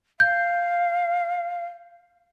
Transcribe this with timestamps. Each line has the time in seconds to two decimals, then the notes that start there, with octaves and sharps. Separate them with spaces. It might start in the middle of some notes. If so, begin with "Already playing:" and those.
0.20 F5 G6